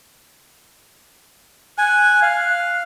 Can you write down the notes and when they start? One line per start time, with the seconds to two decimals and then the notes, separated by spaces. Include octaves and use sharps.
1.78 G#5 F#6
2.22 F5